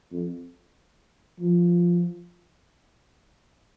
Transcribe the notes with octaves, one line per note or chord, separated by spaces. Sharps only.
F2
F3